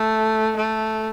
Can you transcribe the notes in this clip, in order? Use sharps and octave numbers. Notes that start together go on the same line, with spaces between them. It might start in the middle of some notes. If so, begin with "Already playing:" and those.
Already playing: A3
A3